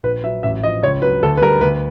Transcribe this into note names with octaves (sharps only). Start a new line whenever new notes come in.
A#1 B4
F#3 E5
A1 E5
F3 D#5
C#2 C#5
F#3 B4
D2 A4
B4
G3 A#4
D2 B4